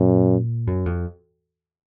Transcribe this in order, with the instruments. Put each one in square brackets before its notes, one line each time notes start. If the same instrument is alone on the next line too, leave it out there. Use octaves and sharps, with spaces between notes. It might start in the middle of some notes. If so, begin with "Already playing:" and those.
Already playing: [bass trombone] F#2 [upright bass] A#2
[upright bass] F#2
F2